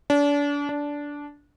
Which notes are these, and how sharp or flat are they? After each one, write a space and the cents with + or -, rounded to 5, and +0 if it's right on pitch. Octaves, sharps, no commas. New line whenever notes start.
D4 -35
D4 -15